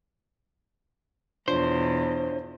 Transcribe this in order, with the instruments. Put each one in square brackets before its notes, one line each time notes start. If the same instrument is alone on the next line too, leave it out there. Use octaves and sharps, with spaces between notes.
[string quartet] E2 B2 [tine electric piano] D4 F4 C#5 [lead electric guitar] C5